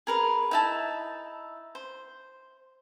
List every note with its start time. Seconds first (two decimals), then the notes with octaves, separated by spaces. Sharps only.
0.07 G#4 A#4 B4
0.51 D#4 E4 A5
1.75 C5